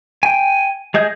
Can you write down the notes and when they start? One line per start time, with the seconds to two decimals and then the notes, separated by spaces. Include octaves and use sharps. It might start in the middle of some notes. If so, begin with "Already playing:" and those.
0.23 G5 G#5
0.94 G#3 G#4 D#5 G6